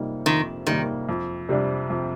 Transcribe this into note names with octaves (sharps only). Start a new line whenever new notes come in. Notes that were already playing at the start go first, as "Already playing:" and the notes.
Already playing: F2 C3 G3 A#3 D#4
F2 D#3
C3 D#3 G3 A#3 D#4
F2
C3 G3 D4
F2